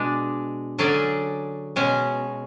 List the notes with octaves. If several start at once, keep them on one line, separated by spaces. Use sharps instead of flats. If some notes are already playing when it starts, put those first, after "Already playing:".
Already playing: B2 G#3 D4
D3 F#3 C#4 G#4 D5
B2 G#3 C#4